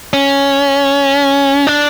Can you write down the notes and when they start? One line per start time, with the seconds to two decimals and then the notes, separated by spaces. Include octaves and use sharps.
0.13 C#4
1.67 D4